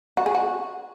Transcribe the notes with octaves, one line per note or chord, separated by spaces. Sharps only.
F#4
G#4
F#4